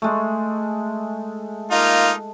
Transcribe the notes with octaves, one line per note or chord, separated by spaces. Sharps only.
G#3 A3
A#3 D#4 F4